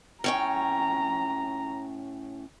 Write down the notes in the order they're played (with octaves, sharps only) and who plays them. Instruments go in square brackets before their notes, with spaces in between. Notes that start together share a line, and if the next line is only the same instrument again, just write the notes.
[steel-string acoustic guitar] A2 C#4 G5 [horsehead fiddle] A#5